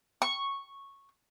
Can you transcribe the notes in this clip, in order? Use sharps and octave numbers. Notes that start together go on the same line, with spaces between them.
C#6